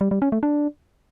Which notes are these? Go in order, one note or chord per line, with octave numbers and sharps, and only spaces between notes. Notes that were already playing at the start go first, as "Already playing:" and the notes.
G3
G3
C#4
A3
D4